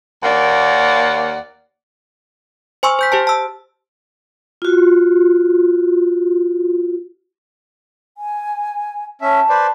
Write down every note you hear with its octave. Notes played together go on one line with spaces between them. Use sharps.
D#2 A#3 D5 F#5
C5 G#5 C6 C#6 E6
C5 G6 B6
G4 C5 A5
A5 E6
F4 F#4
G#5
C#4 E5 A5
B4 C5 D5